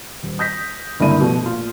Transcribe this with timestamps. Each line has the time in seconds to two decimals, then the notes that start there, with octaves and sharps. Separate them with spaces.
0.23 D#1
0.39 D#6 G6 A#6 B6
1.00 G1 C#2 D3 A#3 E4 D#7
1.21 B2 F3 A3
1.43 A#2 F4